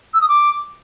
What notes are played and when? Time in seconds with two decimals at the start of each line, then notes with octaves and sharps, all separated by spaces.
0.14 E6
0.21 D#6
0.29 D6